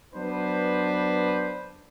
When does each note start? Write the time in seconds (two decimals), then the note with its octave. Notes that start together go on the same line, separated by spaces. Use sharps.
0.13 F#3 B3 D4 B4 C5